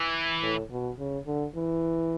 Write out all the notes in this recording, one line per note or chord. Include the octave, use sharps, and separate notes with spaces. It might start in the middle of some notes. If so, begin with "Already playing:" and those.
Already playing: E3
A2
B2
C#3
D3
E3